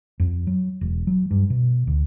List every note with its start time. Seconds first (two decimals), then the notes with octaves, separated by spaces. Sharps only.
0.20 F2
0.47 F#3
0.81 E1
1.07 F#3
1.31 G2
1.50 B2
1.87 D2